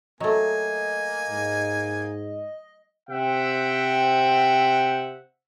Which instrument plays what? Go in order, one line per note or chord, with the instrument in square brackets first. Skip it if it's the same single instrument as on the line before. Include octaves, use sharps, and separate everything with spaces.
[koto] F#3 A3 [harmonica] A#3 G#5 [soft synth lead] D#5
[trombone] G#2
[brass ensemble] C3 C4 E5 F#5 G5